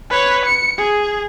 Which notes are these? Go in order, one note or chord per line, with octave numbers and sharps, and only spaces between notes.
B4 C#5
C#7
G#4